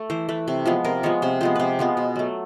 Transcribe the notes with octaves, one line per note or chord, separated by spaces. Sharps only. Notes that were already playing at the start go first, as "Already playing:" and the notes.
Already playing: A3
E3 C5
A3 B4
C3
F3 G#3 B3
C3 A#4
F3 G#3 B3 C#5
C3 C5
F3 G#3 B3 C5
C3 B4 C5
F3 G#3 B3
B2
F#3 A3